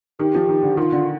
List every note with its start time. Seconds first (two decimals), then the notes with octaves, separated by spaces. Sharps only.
0.19 D#3 G4
0.35 F3
0.49 D#3
0.63 D3
0.77 D#3 F4
0.92 D3